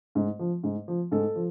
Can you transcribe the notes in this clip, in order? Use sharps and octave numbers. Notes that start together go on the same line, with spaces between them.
G#2
F3
G#2
F3
G#2 A4
F3